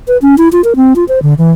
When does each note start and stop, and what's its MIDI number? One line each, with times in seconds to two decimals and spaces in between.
0.08 0.17 71
0.22 0.35 61
0.38 0.49 64
0.52 0.61 65
0.64 0.74 70
0.76 0.93 60
0.96 1.05 65
1.09 1.19 72
1.23 1.34 50
1.38 1.52 52